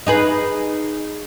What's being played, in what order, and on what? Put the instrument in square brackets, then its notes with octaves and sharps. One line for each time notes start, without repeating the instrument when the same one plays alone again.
[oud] D#4 G#4 B4